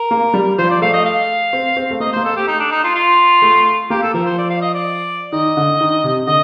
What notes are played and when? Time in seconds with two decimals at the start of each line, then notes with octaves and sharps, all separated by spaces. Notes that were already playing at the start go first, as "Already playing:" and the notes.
Already playing: A#4
0.11 A#3
0.34 G3
0.58 F3 C5
0.70 D5
0.82 A3 F5
0.93 D#5
1.05 F5
1.53 C4
1.77 C4
1.91 A3
2.00 A#3 D#5
2.13 A#3 C5
2.24 A4
2.31 A3 G4
2.48 D#4
2.59 D4
2.72 D#4
2.84 F4
2.95 F4
3.42 A3
3.90 A#3 G4
4.03 A4
4.14 F3 A#4
4.26 C5
4.37 D5
4.50 F5
4.62 D#5
4.73 D5
5.32 D#3 D#5
5.57 D3
5.81 D#3
6.04 C3
6.27 D3 D#5